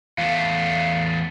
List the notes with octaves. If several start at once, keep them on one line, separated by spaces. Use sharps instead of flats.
E2 A3 F5